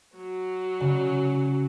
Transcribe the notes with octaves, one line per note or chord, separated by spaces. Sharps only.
F#3
C#3